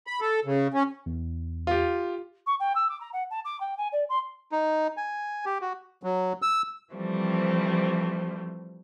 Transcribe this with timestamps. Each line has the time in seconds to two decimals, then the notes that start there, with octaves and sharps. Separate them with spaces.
0.07 B5
0.21 A4
0.45 C#3
0.74 C#4
1.06 E2
1.67 F4 G4
2.46 C#6
2.59 G5
2.75 E6
2.89 D6
3.00 A#5
3.13 F#5
3.30 A5
3.45 D6
3.60 G5
3.77 G#5
3.92 D5
4.09 C6
4.52 D#4
4.97 G#5
5.46 G4
5.61 F#4
6.03 F#3
6.42 E6
6.93 E3 F3 G3 A3 C4